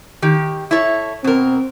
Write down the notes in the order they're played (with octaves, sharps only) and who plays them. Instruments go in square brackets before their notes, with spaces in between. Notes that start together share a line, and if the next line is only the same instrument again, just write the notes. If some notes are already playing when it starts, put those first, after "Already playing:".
[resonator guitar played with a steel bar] D#3 G4
E4 A4 C#5
[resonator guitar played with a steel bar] B2 A#4 [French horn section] C4